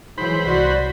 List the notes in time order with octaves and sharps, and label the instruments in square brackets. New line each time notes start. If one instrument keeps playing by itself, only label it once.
[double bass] E3 [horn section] F#3 G#3 [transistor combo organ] C5 B5
[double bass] C2 [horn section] F#4 [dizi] D5